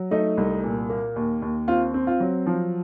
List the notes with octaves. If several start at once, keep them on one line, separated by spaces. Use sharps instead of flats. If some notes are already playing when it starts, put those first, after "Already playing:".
Already playing: F#3
A3 D#4
C2
A#2
A#3
D#2
D#2
C4 F4
C4
F4
F#3
F3